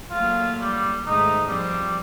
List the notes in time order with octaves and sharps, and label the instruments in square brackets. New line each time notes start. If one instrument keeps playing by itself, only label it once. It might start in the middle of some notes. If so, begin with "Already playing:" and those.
[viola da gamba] F#3 A3 A#3 [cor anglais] F4
[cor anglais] G3
[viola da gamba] G#2 D#3 A3 [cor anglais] D#4
[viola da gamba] F3 C4 [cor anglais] G3